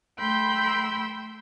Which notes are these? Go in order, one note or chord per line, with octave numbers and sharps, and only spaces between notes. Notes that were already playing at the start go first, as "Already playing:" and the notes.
A3 G5 B5 C6 E6 G6